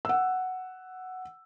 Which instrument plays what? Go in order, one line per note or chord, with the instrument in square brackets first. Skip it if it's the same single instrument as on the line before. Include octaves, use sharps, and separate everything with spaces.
[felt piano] F#5 E6